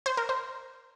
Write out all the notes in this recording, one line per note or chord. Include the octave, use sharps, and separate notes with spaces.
C5
A#4
C5